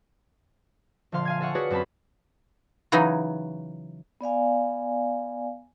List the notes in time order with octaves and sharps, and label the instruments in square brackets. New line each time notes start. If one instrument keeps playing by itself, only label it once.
[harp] A#1 D3 F3 F5 C6
F5 G#5 G#6
A4 F5 F#5 C#6
F#4 G#4 B4 C#5 D5
F#2 C4 A5 B5
[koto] C#3 E3 F#3 D#4
[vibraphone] B3 D5 F5 G#5